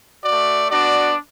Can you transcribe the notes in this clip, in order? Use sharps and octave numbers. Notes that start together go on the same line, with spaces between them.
A3 F#4 D5
B3 D4 F#4 D5